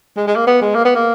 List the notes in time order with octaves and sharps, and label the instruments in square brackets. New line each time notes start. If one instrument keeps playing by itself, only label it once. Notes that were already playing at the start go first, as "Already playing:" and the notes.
[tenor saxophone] G#3
G#3
A#3
B3
G#3
A#3
B3
A#3